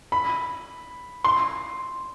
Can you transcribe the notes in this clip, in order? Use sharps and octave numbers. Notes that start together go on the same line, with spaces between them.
B5
C6